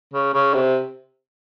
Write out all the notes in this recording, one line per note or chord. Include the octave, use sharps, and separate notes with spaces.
C#3
C#3
C3